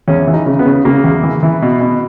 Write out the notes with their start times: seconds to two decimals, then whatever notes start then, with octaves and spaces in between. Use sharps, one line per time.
0.08 E2 C#4
0.27 E3
0.33 D#4
0.46 C#3
0.59 B3
0.66 C#3
0.85 C#3 A#3
1.04 E2
1.24 E3
1.43 E3
1.62 B2
1.81 B2